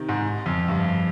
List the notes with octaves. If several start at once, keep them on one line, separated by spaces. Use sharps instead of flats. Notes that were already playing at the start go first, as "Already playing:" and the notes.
Already playing: C3 D#3
G#2
F2
G2